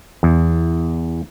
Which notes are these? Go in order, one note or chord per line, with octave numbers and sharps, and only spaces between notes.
E2